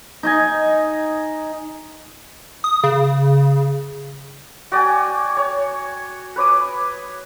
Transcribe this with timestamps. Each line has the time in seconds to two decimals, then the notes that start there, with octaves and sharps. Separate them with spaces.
0.23 D#4 D#5 G#5
2.64 D#6
2.84 C#3
4.72 F#4 D5 G5 G#5
5.37 C#5
6.36 B4 C#5 D6 D#6